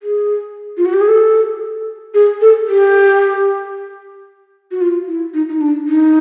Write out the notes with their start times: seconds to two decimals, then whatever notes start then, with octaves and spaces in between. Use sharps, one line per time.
0.03 G#4
0.77 F4
0.85 F#4
0.93 G4
1.01 G#4
1.08 A4
2.14 G#4
2.42 A4
2.68 G4
4.71 F#4
4.81 F4
5.08 E4
5.34 D#4
5.49 D#4
5.61 D4
5.87 D#4